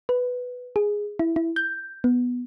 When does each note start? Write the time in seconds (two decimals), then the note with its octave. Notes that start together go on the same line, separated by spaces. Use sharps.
0.09 B4
0.76 G#4
1.19 E4
1.36 E4
1.56 G6
2.04 B3